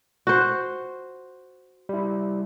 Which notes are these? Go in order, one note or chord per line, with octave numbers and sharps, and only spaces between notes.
F#4 C5
G3 E4